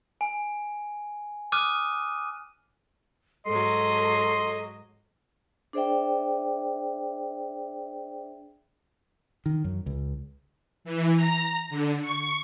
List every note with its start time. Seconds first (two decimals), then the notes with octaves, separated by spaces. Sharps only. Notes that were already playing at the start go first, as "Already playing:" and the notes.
0.21 G#5
1.52 D6 D#6 F6 F#6 D#7
3.46 G#2 F#3 A4 D#5 C6
5.73 D4 G#4 C5 D5 E5 G5
9.46 D#3
9.64 F#2
9.86 C#2
10.84 E3
11.16 A#5
11.70 D3
12.02 C#6